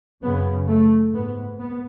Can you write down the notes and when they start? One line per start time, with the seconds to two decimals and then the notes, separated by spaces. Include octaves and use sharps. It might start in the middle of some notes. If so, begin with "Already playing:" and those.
0.23 F#2 C#3 B3
0.68 A3
1.13 G#2 B3
1.58 B3